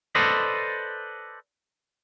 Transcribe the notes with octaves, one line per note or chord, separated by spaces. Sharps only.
A4 B4 C5 D5 D#5